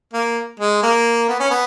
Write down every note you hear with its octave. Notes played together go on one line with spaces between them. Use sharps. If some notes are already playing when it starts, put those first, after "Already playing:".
A#3
G#3
A#3
B3
C#4
B3